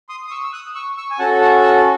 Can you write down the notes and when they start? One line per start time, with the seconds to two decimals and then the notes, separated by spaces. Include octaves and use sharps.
0.09 C6 D#6
0.27 D#6
0.31 C#6 E6
0.44 E6
0.53 D#6 F#6
0.75 C#6 E6
0.97 C#6 E6
1.11 G#5
1.19 C#4 F#4 A4 F#5 A5
1.41 F#5 A5
1.63 F#5 A5